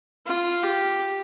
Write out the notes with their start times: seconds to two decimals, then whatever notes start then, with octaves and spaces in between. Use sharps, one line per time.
0.26 F4
0.63 G4